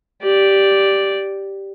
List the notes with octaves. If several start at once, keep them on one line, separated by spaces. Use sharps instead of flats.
G4 D5